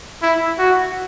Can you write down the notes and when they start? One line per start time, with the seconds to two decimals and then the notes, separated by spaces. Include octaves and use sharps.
0.22 E4
0.59 F#4